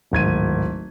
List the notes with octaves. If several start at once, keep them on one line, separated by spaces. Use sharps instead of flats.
D1 G#1 G#6 D#7